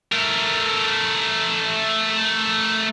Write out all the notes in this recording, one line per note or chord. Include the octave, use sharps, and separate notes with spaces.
A3 A#4